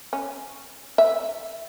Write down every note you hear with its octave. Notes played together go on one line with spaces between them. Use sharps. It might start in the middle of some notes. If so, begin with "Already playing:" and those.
C#4
E5